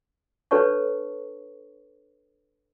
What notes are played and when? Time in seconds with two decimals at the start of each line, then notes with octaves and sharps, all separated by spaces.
0.51 D4 A4 B4 C#5 A5 C#6